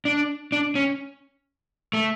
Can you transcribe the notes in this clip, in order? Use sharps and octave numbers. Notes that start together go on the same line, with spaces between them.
D4
D4
C#4
A3